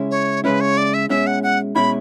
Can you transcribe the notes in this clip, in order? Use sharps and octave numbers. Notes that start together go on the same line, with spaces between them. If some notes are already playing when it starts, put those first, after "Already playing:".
Already playing: C#3 G#3 C#4 E4
C#5
C#3 G#3 C#4 E4 B4
C#5
D5
E5
B2 G#3 C#4 E4 E5
F#5
F#5
B2 G#3 C#4 E4 B5